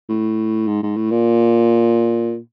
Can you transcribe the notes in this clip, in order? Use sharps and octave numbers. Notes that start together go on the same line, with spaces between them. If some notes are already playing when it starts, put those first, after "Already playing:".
A2
G#2
G#2
A2
A#2